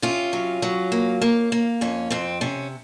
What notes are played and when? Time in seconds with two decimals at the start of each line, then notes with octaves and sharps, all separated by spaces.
0.02 C3 C#4 F4
0.33 F#3
0.62 F#3
0.92 A#3
1.21 A#3
1.52 A#3
1.81 F2 C#4
2.10 F2 C4
2.41 C3 C#4